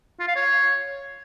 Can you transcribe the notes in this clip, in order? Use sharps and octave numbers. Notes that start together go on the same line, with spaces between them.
F4
F5
C#5